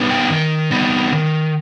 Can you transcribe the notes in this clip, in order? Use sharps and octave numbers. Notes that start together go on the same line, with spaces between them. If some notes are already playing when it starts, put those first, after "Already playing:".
Already playing: G3 B3 D#4
G5
D#3
G3 B3 D#4
D#3